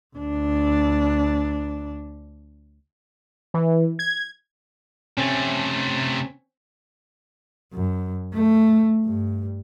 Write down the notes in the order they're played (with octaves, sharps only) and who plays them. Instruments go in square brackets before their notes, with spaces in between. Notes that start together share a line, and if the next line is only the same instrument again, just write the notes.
[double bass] D2 D4
[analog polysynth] E3
G#6
[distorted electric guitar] C3 A3 [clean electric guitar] C4 C#4
[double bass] F#2
A3
G2